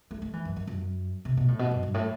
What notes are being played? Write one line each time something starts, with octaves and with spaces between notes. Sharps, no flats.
A3
A3
E3
F#2
F#2
F#2
C3
B2
A2
B2
F#2
G2
A2